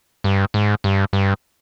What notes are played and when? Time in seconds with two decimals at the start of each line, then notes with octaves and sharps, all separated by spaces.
0.24 G2
0.54 G#2
0.84 G2
1.13 G2